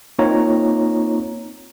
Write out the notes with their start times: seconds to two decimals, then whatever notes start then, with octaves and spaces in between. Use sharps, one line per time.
0.19 A#3 C4 D#4 F4 C#5 A#5